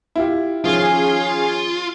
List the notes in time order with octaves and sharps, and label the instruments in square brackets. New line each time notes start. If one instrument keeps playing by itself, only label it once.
[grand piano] E4 F4 G4
[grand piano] D#3 F3 [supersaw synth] C#4 G#4 [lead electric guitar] F4